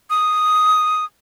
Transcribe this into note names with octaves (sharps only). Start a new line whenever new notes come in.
D#6